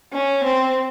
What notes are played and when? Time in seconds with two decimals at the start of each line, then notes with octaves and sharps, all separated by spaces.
0.12 C#4
0.44 C4